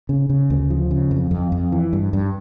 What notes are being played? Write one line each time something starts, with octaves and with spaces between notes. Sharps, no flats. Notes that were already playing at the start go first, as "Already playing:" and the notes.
C#3
C#3
D2
F3
C#3
F2
F2
F2
E3
G2
G2